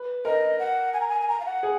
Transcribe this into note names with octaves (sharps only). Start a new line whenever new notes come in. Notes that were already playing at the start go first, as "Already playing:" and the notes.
Already playing: B4
A#4 D#5
F#5
G#5
A#5
G#5
G#5
A#5
F5
F#5
G#4